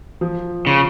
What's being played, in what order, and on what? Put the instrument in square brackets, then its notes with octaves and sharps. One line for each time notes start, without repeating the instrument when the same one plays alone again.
[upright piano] F3
[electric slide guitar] C#3 [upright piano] F4